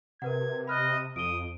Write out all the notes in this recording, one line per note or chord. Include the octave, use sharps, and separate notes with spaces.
C3 A#4 B4 F#5 G#6
D#5 B5 F6 F#6
F2 D#6 D7 G7